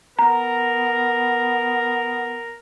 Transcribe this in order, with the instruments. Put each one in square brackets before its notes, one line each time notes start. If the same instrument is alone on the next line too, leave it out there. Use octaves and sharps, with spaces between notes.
[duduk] B3 [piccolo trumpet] A#4 [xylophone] A#5